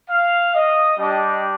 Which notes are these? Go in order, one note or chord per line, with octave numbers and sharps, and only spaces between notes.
F5
D#5
G3 D4 G4 D#5